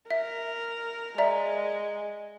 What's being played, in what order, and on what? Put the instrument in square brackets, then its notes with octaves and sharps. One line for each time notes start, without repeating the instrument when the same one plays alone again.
[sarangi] A#4 [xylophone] E5
[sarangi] G#3 [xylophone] D5 E5 A#5